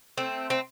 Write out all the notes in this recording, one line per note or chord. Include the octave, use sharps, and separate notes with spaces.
A3 C4
C4